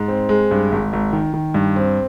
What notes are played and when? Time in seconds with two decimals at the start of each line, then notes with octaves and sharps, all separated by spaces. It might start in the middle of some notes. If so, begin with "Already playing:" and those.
Already playing: G#2
0.08 C4
0.29 G#3
0.51 G2
0.72 G#1
0.93 G#1
1.13 D#3
1.34 D#3
1.54 G2
1.76 C4